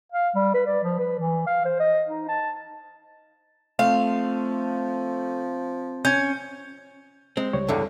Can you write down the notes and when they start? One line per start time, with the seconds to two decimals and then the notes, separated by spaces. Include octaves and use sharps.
0.12 F5
0.35 G3
0.54 B4
0.67 D5
0.83 F3
1.00 B4
1.19 E3
1.47 F5
1.66 C5
1.80 D#5
2.09 D#4
2.29 A5
3.79 F3 A3 C4 F5
6.05 C#4 G6 G#6
7.37 G#3 C4
7.53 C#2 G3 C#5
7.69 E2 G2 D3